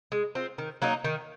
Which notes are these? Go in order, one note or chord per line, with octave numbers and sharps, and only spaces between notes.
G#3
C4 F4
D#3
F#3 A#3 D#4
D#3